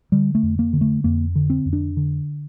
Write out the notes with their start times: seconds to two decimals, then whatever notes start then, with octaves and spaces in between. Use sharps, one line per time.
0.12 D3 G3
0.35 A3
0.43 F2
0.59 A#3
0.73 D3
0.81 A3
1.04 F2 A#3
1.36 D3
1.50 C4
1.66 F2
1.73 D4
1.97 D3